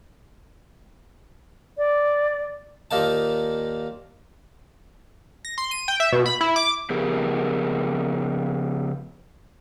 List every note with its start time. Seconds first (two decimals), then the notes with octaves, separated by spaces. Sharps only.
1.78 D5
2.91 D#2 A#2 A#3 D#4 A5
5.45 A#6
5.58 C6
5.71 D#7
5.88 G5
6.00 E5
6.12 B2
6.26 B5
6.41 E4
6.56 D6
6.90 C#3 F3 B3 G4 G#4 A#4